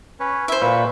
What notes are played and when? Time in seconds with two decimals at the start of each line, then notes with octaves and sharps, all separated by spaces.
0.20 C#4 B4 C#5
0.48 E4 C5 E5
0.62 A#2 B4 C#6